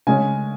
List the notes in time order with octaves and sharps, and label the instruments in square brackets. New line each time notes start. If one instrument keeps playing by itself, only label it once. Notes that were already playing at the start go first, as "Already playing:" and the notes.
[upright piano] C#3 G#3 C#4 G#5